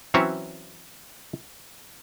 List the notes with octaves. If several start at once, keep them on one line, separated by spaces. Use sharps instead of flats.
E3 F#3 C4 C#4 C#5 E5